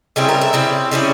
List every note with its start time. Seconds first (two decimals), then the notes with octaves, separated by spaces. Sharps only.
0.16 C#3 G3 C4 E4 G#4
0.29 A#4
0.41 E5
0.53 C#3 G3 C4 E4
0.91 C#3 G3 C#4 E4